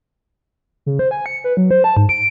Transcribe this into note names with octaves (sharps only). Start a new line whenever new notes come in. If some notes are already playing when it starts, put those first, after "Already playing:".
C#3
C5
G#5
C#7
B4
F#3
C5
A5
G#2
D7